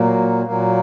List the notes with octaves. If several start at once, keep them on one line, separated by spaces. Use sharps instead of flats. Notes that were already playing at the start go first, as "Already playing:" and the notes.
Already playing: A#2 F#3 A#3
A#2 F#3 A#3